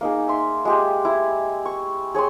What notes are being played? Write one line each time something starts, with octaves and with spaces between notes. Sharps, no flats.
A#3 D#4 G#4
E5 C6
G#3 G4 G#4
E4
C#6
G#4 C#5 G5 C6